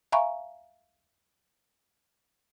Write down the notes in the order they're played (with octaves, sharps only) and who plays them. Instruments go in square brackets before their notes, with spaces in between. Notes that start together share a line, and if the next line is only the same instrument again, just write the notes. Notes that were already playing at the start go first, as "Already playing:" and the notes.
[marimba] E5 F5 G#5 A#5 B5 C#6